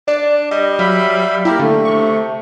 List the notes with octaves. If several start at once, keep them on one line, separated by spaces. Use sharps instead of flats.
D4 D5
G3 D#5
F#3 E5 F5 B5
A#3 E4 G4 A#4
D3 A3
C3 C#6